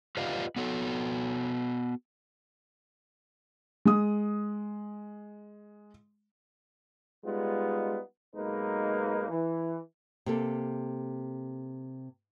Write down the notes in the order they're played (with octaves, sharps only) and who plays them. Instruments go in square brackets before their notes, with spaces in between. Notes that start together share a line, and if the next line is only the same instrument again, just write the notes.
[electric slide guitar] F4 G4 B4 D5 D#5 F5
B3 F#4 A4
[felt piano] G#3 D#6
[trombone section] G3 G#3 B3 D#4 F4
B1 G#3 A#3 D#4 B4
E3
[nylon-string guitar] C3 A#3 A4